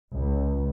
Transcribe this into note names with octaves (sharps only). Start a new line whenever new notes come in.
C#2